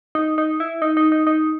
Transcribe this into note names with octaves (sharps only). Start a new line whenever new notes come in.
D#4
D#4
E4
D#4
D#4
D#4
D#4